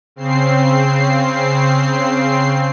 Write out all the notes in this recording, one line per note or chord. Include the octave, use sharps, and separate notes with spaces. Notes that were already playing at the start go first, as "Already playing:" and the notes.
C#3 C4 C7